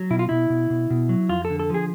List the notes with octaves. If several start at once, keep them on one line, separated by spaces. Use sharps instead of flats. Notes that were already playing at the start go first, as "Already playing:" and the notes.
Already playing: F#3
B2 E4
F4
B2 E4
B2
B2
B2
F#3
F2 F4
A4
D3
A4
F3 G#4